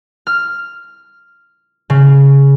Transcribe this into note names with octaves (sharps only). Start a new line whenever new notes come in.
F6
C#3